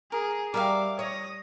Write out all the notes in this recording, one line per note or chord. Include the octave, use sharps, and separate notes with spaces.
G#4 A#4
G3 A#4 E5 F5 D6
C#5 D#6 A#6